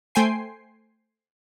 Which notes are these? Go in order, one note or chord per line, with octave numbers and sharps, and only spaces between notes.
A3 C5 G5 G#5 C7